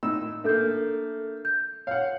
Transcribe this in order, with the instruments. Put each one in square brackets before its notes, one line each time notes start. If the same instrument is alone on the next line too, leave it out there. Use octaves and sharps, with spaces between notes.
[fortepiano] A2 D#4 E6
[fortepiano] A3 A#3 [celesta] D4 A4 G6
[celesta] G6
[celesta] C#5 [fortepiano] F5 F#5